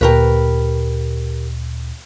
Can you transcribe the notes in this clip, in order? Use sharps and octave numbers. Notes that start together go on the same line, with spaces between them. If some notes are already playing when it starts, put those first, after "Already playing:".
D2 A#2 G4 A#4 B4